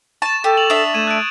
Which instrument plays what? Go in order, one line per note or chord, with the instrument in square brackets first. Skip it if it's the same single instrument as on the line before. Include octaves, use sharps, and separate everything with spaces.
[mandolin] A5 [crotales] C#6 A6 E7
[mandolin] G4 [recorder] A4
[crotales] F7 F#7
[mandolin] D4 E5 [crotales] D#6
[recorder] A3 [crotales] G#6 D#7 E7
[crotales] F#6 D7